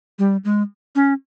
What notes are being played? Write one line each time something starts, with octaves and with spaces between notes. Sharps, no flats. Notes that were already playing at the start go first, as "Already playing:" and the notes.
G3
G#3
C#4